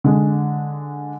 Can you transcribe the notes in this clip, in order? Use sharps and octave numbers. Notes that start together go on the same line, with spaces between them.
D3 G#3